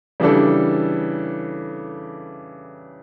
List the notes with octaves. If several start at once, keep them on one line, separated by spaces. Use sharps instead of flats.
C#3 E3 G3 D4 A4